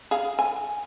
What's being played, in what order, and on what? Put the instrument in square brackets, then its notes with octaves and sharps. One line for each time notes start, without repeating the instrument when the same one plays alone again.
[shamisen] G#4 F5
G#5